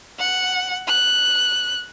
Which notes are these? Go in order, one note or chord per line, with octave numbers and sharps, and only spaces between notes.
F#5
F#6